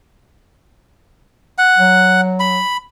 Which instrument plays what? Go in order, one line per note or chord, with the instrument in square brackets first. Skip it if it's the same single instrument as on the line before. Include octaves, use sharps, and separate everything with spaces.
[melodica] F#5
[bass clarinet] F#3
[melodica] B5